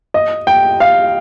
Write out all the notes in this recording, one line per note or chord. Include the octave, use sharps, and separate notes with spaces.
D#5
G5
F5